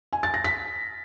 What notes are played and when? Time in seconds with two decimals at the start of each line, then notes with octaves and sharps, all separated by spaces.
0.13 G#5
0.23 A6
0.34 A#6
0.44 B6